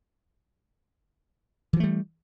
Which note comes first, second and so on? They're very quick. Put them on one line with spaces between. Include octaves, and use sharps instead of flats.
E3 F3 A3 G3